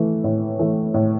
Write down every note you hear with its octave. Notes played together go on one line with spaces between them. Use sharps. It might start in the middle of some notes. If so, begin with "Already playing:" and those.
Already playing: E3 A3
A2
E3 A3
A2